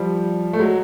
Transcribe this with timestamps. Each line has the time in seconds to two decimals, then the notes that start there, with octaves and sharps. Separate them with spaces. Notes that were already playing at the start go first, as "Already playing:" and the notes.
Already playing: F3 G3
0.53 A3
0.59 F#3 G#3